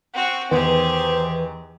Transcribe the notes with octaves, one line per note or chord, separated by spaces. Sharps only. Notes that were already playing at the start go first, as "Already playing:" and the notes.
C4 F#4 F#5
E2 D#3 E3 D#4 G4 G#4 C5